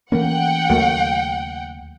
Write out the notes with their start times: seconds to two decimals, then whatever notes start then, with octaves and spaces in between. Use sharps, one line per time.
0.12 E3 A3 A#3 C#4 F#5 G5
0.69 D#2 C#3 F#3 A3 A#3